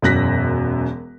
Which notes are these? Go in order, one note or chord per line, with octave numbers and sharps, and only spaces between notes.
E1 F#2 F#6 A#6 B6